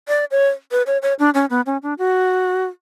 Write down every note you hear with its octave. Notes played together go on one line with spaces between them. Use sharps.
D5
C#5
B4
C#5
C#5
D4
C#4
B3
C#4
D4
F#4